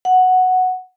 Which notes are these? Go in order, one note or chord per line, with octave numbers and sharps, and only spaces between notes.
F#5